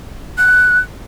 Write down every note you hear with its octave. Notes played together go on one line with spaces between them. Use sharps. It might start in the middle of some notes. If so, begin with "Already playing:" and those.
F#6